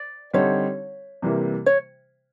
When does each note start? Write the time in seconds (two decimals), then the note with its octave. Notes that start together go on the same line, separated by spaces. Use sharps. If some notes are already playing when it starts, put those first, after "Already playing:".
Already playing: D5
0.34 D3 G3 C4 D#4 C#5
1.22 C3 E3 G3 A#3
1.66 C#5